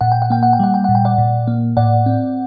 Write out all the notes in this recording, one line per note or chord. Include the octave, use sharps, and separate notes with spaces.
A#2 F#5
G5
F#5
A#3 G5
F#5
G5
G3 F#5
G5
A#2 F#5
G5
D5 F#5
A#2
A#3
A2 D5 F#5
C4